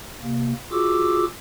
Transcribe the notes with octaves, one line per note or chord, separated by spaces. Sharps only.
C3 A#3
F4 F#4 G#4 D6 E6